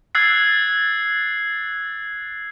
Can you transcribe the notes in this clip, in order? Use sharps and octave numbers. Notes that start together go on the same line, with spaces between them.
E6 F#6 G#6 A6 C7